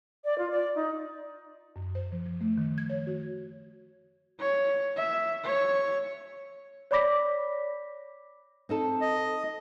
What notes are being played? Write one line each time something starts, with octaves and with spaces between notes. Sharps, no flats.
D5
F4
D5
D#4
F#2
C5
F3
F3
A3
D#3
G#6
C#5
F#4
C#5
E5
C#5
C#5 D5 B5 D6 A#6 B6
C4 D#4 A4
D#5